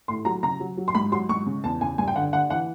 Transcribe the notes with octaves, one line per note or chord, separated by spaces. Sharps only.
A2 C6
F#3 A#5
C#3 A#5
F#3
F#3
C6
G#2 B5
F#3 C6
G#2 C#6
C#3
E2 A5
C#3 G#5
G2 G#5
G5
D3 F#5
D3 F#5
E3 F#5